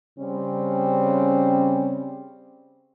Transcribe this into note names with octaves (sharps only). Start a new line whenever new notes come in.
C#3 G3 C4 C#4